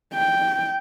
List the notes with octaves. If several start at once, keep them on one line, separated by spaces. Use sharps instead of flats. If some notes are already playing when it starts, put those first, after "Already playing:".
G5